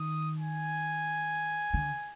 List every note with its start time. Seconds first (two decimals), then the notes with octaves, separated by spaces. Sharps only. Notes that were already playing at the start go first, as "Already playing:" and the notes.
Already playing: D#3 D#6
0.39 G#5
1.74 D3